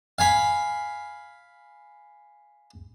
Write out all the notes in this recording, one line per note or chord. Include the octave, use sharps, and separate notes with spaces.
F5 G#5 B5